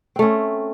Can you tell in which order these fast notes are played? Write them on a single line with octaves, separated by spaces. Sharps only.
C4 A3 C#4